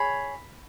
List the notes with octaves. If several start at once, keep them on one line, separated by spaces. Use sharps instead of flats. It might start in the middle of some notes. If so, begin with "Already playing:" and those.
Already playing: G#4 C#5 B5